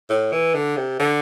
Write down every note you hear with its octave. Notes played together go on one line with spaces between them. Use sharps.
A2
E3
D3
C3
D3